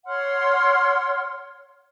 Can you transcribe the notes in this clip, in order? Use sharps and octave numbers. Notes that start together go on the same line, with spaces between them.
C#5 F#5 C6 F6